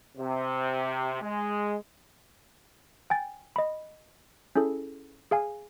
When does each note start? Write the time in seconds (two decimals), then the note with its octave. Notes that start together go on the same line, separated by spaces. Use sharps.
0.17 C3
1.21 G#3
3.10 G5 G#5 A6
3.56 D#5 B5
4.56 C#4 E4 G#4 A4
5.31 G#4 F5 G#5